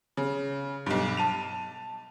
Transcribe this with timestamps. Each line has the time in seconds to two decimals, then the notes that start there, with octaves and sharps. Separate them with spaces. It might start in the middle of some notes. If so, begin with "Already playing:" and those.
0.17 C#3
0.86 B1 G2
1.17 A5 D#7 F7